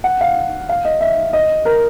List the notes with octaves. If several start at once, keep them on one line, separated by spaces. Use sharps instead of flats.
F#5
F5
F5
D#5
E5
D#5
A#4